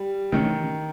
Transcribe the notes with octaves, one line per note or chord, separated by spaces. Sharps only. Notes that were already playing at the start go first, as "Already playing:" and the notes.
Already playing: G3
D#3 E3 A3 C#4